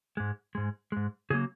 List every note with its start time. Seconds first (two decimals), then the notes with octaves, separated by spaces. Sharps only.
0.17 G#2 G#3
0.55 G#2 G#3
0.92 G#2 G#3
1.30 C#3 F#3 A#3 G#4